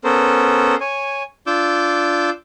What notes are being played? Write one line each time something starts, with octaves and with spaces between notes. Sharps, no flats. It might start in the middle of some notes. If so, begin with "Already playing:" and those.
B3 C#4 A4 A#4 C5
C#5 G#5
D4 F4 D6 E6 G6